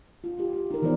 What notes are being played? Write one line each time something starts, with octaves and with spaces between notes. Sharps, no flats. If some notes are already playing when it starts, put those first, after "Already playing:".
F4
F4 G4
G4
D#4 A#4
E3 F3 B3 A#4 C5 D5